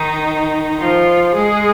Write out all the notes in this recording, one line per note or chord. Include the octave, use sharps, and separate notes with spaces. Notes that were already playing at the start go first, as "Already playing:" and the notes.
Already playing: D#3 D#4
F3 F4
G#3 G#4